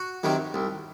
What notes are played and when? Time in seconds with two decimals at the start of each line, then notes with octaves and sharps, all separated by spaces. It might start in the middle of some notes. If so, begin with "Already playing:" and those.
Already playing: F#4
0.23 C3 D#3 F#3
0.54 C2